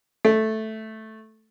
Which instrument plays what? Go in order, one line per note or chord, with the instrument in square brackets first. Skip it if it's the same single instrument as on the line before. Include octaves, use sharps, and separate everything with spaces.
[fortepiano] A3